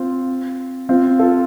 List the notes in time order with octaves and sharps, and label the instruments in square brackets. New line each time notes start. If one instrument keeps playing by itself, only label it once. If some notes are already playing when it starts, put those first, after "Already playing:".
Already playing: [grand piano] C4 F4
C4 F4
F4 A4